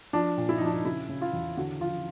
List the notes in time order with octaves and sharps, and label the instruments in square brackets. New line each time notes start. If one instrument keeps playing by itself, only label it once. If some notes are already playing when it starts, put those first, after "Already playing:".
[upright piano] F3 D4
A#2
E4
D#4
F3 D4
D#4
C#3 E4
C#3
F4
E2
D3 F#4
F3 F4